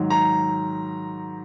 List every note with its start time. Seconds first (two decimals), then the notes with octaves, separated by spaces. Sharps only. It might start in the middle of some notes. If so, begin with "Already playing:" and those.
Already playing: G#2 D#3 F#3
0.10 A#5